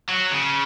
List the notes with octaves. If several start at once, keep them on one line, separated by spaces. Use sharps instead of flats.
F#3
C#3